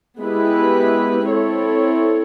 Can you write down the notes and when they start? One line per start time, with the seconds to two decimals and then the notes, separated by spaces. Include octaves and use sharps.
0.21 G#3 B3 E4 G4 B4
1.28 C4 E4 A4 C#5